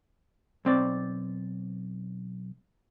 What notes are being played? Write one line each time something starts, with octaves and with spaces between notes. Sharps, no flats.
B1 C4 D5